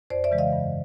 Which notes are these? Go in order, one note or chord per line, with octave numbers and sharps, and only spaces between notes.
F2 C5 D5
D5 E5
C#3 E3 G#3
D#5 F5
G2